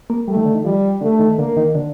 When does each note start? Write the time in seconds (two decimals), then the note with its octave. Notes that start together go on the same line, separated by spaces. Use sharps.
0.10 A#3
0.28 G3 A3
0.37 D#3
0.45 D3
0.55 D#3
0.64 F3 G3
1.01 D3 A3
1.19 D#3
1.38 D3 A#3
1.57 D#3
1.75 D3